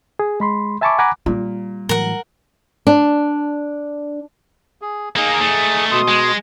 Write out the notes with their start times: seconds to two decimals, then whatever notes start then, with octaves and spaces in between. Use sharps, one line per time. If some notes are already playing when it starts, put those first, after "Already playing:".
0.19 G#4
0.40 G#3 B5 C6
0.81 E5 G#5 A5 B5 C#6 D6
0.99 F#5 G#5 A#5 B5 D6 F#6
1.26 A#2 G3
1.89 A2 E3 F#3 A#4 F#5
2.87 D4
4.82 G#4
5.16 A#3 D#4 G#4
5.40 A3 D#4
5.91 B2 C6 D#6
6.08 G#3